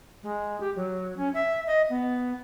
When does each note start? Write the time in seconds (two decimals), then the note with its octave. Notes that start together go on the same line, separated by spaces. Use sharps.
0.23 G#3
0.60 G4
0.76 F#3
1.17 C#4
1.34 E5
1.67 D#5
1.89 B3